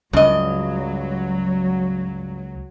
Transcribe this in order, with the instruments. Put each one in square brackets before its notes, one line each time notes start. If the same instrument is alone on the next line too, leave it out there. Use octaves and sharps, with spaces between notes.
[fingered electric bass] C#2 [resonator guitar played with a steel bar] G2 D#5 [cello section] F#3